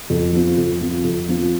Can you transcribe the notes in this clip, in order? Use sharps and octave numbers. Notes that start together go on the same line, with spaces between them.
F2
F3 C4 F4
F2
F3 C4 F4
F2
F3 C4 F4